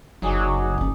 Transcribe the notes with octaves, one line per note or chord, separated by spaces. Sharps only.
F#1 F#3 D#4 G#4 D5
A3 C#4